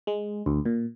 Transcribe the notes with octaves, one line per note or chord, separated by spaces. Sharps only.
G#3
D2
A#2